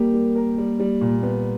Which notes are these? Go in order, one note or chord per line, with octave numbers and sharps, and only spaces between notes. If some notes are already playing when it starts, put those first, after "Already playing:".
Already playing: G3 A#3 G4
G3
A#4
G3
G3
A#2
B3